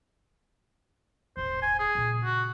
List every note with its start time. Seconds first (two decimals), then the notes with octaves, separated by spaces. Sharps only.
1.37 E1 A1 C5
1.62 G#5
1.79 G#4
1.95 A#2 C#3
2.24 F#4